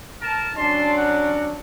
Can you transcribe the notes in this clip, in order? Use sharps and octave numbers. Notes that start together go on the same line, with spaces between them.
A#4 A5
F#3 C#4 D4 A5 C6
A#4 F#5